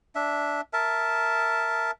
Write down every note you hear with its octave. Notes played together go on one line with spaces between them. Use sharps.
D4 E5
A#4 E5 A5